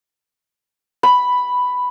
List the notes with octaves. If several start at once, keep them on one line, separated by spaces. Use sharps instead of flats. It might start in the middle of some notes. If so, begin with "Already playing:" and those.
B5